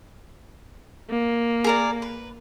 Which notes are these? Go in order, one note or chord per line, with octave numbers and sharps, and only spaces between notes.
A#3
G#4 A#4 D5
B4